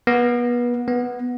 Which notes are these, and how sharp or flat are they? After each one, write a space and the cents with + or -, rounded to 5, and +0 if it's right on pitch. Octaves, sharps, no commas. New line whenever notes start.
B3 -30
B3 -10